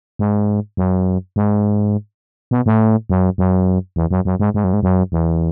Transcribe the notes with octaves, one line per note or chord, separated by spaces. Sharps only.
G#2
F#2
G#2
B2
A2
F#2
F#2
E2
F#2
F#2
G#2
G#2
F#2
G#2
F#2
E2